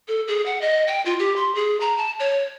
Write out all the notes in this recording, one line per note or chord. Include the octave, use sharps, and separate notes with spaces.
A4
G#4
F#5
D#5
G5
F4
G4
C6
G#4
A#5
A5
C#5